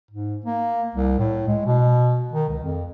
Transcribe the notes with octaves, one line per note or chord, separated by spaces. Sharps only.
G#2
A#3
C2
A2
G#3
B2
D#3
C#2
F2